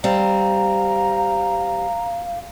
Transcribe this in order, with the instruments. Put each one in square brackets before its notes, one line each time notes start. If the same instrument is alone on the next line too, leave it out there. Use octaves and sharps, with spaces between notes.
[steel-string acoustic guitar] G3 C4 [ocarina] F5 [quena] A#5